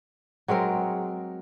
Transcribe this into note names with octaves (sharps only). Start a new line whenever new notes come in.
F#3 G#3 C4 A#4